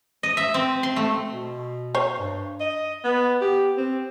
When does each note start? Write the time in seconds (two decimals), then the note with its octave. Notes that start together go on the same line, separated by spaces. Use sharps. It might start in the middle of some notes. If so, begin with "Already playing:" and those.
0.23 D#5
0.37 E5
0.54 C4
0.83 C6
0.96 A3
1.31 B2
1.95 C5 C#5
2.18 G2
2.60 D#5
3.04 B3
3.41 G4
3.77 C4